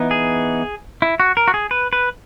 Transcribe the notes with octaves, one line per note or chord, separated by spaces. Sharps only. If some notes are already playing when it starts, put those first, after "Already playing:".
Already playing: E3 B3 D#4
G#4
E4
F#4
A#4
F#4
G#4
B4
B4